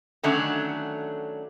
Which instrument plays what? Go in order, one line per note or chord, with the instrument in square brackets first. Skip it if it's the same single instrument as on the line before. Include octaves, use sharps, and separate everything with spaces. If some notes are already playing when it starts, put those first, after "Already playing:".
[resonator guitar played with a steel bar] D3 D#3 F#3 A3 C#4 D4